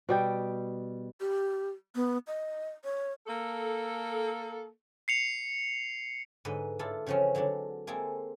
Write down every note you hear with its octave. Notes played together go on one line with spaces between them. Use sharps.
B2 G3 G5
G4
B3
D#5
C#5
A#3 A4
C7 C#7 F7
G#2 D3 B4 D#5
D4 E4 F4 A4
C#3 E3 F3 C4 C#4
D3 F#3 G#3 D4
G#3 A#3 C4 G#4 A4